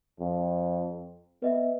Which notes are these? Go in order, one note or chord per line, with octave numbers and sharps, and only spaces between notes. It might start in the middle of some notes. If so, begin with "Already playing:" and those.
F2
B3 B4 D#5 E5